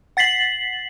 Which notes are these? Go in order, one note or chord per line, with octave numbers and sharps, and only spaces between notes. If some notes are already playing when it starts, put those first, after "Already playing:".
F#5 A6 B6 C7 F#7